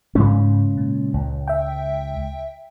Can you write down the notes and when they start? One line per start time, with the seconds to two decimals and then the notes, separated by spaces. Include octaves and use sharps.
0.15 G#2 C#3 G#3 C#4
0.77 A#2
1.14 C#2
1.48 E5 G5